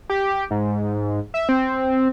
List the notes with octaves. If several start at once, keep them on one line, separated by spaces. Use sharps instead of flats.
G4
G#2
E5
C4